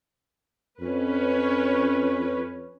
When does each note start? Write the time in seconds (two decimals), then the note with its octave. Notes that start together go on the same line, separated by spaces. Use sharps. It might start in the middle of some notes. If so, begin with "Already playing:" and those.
0.81 F2 C#4 B4